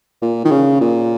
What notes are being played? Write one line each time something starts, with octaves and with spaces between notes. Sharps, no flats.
A#2
D#3
C#3
A#2